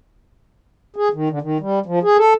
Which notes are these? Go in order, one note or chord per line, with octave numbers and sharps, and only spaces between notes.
G#4
D#3
D3
D#3
G3
F3
G#4
A4